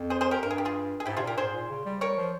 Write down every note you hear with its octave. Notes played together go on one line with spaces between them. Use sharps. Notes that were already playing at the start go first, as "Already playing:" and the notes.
Already playing: F2
G#4 C5
G#4 C5
G4 A#4
G2 A#4
G#4
G4
F4 G#4
G#4
G#2 E4 G4
C3 F4 G#4
A#2
G4 A#4
G#2 G#4 C5
A#2
C#3
G3
G3 A#4 C#5
F3